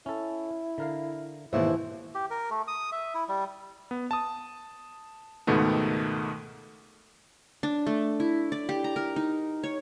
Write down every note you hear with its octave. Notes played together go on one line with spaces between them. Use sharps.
C#4 E4 A4
D3 A#4 F5
D#2 G#2 B2 D#3 E3 E4 C5
G4
A#4
A3
D#6
E5
E4
G3
B3
A5 D#6
C#2 G#2 B2 D#3 A3 B3
D4
A3
E4
D5
G4
A#5
A#4
D#4
C#5